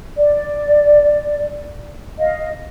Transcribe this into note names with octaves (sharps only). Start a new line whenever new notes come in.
D5
D#5 F5